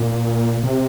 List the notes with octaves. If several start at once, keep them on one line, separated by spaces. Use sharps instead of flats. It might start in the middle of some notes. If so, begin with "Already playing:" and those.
Already playing: A#2
C3